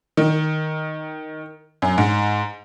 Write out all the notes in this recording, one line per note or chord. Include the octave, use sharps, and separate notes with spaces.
D#3
F#2
G#2